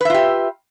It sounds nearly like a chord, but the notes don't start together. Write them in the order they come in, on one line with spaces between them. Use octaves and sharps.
B4 E5 F4 G4